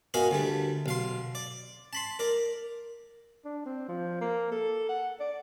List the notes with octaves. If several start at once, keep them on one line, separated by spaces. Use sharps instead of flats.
B3 F#4 A#4 D#5 F5 G#5
D2 G3 A3
B1 F5 C6
D5
A5 B5 C6
A#4 D5
D4
C4
F3
A#3
A4
F#5
D5